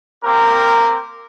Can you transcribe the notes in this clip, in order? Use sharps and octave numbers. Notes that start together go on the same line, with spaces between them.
A#3 C4 G4 A#4